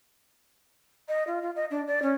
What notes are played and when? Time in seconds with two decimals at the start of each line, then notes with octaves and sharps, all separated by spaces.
1.08 D#5
1.27 F4
1.42 F4
1.55 D#5
1.70 D4
1.87 D5
2.02 C#4